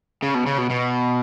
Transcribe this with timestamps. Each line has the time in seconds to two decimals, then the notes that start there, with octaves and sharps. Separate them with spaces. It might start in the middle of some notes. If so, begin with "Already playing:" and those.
0.22 C#3
0.34 B2
0.46 C#3
0.58 B2
0.70 B2